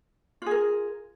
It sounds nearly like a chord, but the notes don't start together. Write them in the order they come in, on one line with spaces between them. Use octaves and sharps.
F4 G#4 A#4